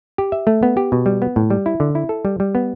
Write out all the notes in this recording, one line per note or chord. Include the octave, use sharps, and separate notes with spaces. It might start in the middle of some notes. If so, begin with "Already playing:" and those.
G4
E5
A3
B3
G4
B2
G3
B3
A2
G3
E4
D3
E4
A4
G3
G3
B3